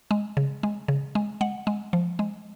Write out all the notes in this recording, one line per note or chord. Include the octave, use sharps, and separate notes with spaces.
G#3
C#3
G#3
C#3
G#3
G#3 F#5
G#3
F3
G#3